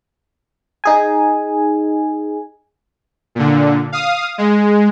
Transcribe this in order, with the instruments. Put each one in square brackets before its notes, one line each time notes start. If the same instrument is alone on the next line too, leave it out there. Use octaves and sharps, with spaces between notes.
[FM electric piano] D#4 G#4 G#5
[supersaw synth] A#2 D3
F5 D#6
G#3